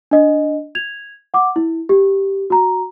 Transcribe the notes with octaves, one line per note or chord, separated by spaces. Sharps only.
D4 D#5
G#6 F7
F#5 D6
E4
G4
F#4 A#5